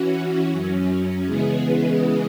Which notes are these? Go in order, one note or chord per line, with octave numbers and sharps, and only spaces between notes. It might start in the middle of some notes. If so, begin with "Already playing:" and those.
Already playing: E3 C#4 F#4
F#2 F#3 C#4
C#3 E3 G#3 B3 G#4